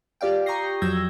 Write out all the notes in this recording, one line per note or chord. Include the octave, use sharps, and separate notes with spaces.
F4 G4 D5 F5 G5
A#5 C#6 D#6 G6 A#6 C7
F2 F#3 E6 G6 G#6 A#6